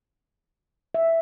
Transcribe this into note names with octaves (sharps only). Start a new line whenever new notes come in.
E5